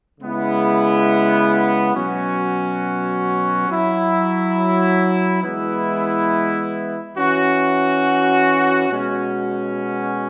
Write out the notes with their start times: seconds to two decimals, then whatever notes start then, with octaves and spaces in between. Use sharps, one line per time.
0.21 C#3 G#3 B3 E4
1.95 B2 F#3 C#4 F#4
3.69 F#3 E4
5.43 E3 G#3 B3 E4
7.16 E3 C#4 F#4
8.90 B2 G#3 C#4 F#4